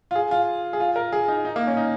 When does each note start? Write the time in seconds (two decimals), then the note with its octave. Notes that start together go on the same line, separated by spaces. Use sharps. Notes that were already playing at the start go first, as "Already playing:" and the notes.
0.11 F4
0.15 G#4
0.31 F4
0.73 G#4
0.80 F4
0.96 A#4
1.12 G#4
1.28 D#4
1.45 D#4
1.56 A#3
1.67 C#4
1.77 D#4